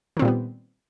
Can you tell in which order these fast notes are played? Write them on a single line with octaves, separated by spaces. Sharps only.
D#3 C4 A#2 G3 B3